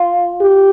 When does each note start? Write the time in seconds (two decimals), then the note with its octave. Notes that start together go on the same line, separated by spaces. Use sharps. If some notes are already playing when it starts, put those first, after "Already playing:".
Already playing: F4
0.41 G4